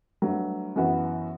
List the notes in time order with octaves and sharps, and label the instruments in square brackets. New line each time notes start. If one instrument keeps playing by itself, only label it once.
[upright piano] G2 F#3 A3
F#2 E3 B3 F#4